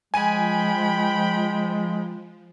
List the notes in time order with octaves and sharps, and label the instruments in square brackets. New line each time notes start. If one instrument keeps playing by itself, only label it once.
[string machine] F3 [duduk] G#3 [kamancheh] G5 B5 [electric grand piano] G#5 D#7